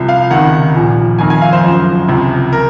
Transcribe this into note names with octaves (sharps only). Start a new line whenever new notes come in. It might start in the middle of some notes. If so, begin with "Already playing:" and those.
Already playing: C2 C3 F3
F5
C#2 C3 D#3 F#5
A#1 A#2 F3
F1 F2 D#3 G#5
G#5
F5
C5
F#1 F#2 F3
C#2 C3 F3
A#4